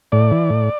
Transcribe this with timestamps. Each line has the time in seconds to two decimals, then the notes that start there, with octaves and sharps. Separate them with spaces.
0.12 A2 D5
0.31 E3
0.50 A2